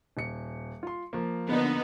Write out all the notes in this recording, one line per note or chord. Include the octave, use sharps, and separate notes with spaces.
D#1 C#7
F4 C6
F3 A#3
D3 B3 D#4